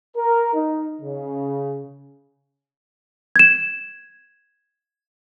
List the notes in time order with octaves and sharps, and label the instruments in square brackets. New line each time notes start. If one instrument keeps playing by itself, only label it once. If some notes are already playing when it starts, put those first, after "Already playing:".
[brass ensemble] A#4
D#4
C#3
[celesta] G#6 E7